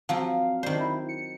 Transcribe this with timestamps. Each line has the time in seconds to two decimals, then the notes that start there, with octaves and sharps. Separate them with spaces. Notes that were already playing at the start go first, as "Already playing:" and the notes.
0.09 F3 F#3 C4 F5
0.63 D#3 D4 C5
0.80 E4
1.09 C#7